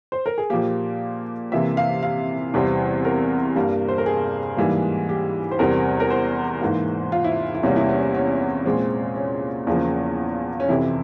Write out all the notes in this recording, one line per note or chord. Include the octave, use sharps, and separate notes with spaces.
C5
A#4
G#4
A#2 F3 A#3 G4
C3 E3 A#3 E5
F5
F5
E2 C3 E3 G3 C4
A#4
G2 G3 A#3
C5
A#4
G#4
G#2 E3 G3 A#3
G4
C5
E2 C3 G3 C4 A#4
A#4
C5
G#2 E3 A#3
F4
E4
E4
E2 C3 G3 A#3 C#4
E4
C#4
C#4
A#2 G#3 C4
C#4
E2 C#3 F3 A#3
C#4
F2 C3 E3 E4